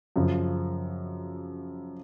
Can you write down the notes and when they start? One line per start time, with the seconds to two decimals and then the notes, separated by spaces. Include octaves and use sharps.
0.16 F#2 C#3 F3